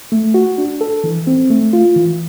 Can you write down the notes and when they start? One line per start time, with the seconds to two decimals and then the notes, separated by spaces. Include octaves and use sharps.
0.12 A3
0.34 F#4
0.58 D4
0.81 A4
1.04 E3
1.27 C4
1.50 A3
1.73 F4
1.96 E3